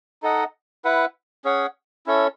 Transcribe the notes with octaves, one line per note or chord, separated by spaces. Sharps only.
D#4 A4 D#5 F#5
E4 B4 F#5
C#4 G#4 C#5 F#5
C#4 E4 A4 C#5